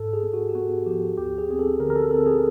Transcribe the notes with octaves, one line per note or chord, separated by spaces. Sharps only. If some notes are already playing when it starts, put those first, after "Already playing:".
Already playing: G#2 A4
G#4
B3
F#4
G4
B3 F#4
F3 G4
D2 G4
G#4
C4 G#4
A4
D3 A#4
A#4
A4
C4 A4
G#4